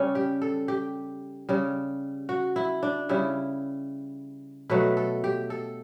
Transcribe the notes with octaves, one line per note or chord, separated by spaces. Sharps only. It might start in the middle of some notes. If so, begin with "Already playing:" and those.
Already playing: C#3 G3 C#4
G4
A4
G4
C#3 G3
F#4
E4
D4
C#3 G3 E4
B2 F#3 A3 B4
A4
G4
A4